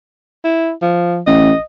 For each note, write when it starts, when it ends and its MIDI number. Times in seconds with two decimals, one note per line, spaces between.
0.44 0.72 64
0.82 1.21 53
1.27 1.51 33
1.27 1.61 75